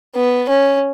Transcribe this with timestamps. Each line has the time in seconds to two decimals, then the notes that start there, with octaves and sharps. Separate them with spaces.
0.15 B3
0.49 C#4